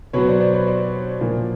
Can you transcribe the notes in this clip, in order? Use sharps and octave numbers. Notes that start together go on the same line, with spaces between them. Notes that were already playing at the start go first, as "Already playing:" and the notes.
B2 F#3 B3 B4 C#5
C5 D5
C5 D5
B4 C#5
C5 D5
A#2 F3 A#3